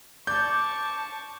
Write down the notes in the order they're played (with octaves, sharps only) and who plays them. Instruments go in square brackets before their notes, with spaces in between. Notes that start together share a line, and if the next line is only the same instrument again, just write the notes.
[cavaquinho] D5 [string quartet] A5 C#6 [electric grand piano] G6